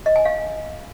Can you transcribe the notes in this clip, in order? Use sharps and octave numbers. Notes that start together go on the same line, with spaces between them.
D#5
G#5
F5